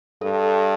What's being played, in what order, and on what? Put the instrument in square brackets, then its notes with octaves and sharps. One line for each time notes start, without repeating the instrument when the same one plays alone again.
[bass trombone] G2 [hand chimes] A4